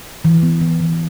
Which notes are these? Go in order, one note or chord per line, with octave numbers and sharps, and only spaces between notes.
E3
B3
E3
E3